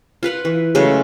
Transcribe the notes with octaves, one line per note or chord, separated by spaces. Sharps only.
F4 B4 F5 F#5
E3
C#3 F#3 G#3 A3